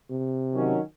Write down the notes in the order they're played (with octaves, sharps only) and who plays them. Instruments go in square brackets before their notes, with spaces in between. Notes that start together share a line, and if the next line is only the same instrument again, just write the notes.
[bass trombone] C3
[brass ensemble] D#3 F#3 C#4